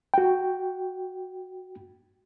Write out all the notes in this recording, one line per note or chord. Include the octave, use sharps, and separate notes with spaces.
F#4 G5